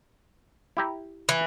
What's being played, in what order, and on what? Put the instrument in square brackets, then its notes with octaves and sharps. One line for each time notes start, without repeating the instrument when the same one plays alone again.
[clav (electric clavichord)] E4 G4 A#5
[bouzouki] E3